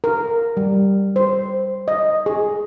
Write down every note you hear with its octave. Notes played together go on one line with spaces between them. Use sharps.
A#4
G3
C5
D#5
G#4